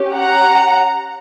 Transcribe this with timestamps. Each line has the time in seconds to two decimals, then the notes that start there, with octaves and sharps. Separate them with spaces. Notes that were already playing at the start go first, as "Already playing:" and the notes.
Already playing: C#4 G4
0.16 F#5 A#5